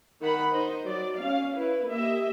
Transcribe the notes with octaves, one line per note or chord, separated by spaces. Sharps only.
D#3 F#5 B5
D#4 C5 D#5
F#3 D5
C#4 F5
E4 B4
A#3 G4 D#5 E5